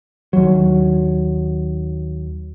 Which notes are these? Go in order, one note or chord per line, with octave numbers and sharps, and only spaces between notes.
D#2 F#3